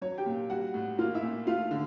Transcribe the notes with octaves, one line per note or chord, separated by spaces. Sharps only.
F#3 C#5
G4 G5
A#2
G3 F#4 F#5
A2
A#3 F4 F5
E4 E5
A#2
A3 F4 F5
D3